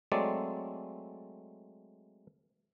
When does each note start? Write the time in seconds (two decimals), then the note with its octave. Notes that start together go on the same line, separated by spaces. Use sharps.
0.12 F#3 G#3 A3 C4 D5